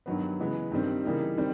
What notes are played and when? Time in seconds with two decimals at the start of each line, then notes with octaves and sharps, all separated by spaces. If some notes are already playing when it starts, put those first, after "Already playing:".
0.06 G2 D#3 F#3 B3
0.40 C#3 E3 G#3 B3
0.72 G2 D#3 G3 C4
1.04 C#3 E3 G3 A#3 D#4
1.37 D#3 G3 C4